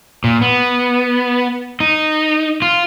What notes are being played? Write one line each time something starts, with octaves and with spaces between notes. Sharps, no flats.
A#2
B3
D#4
F4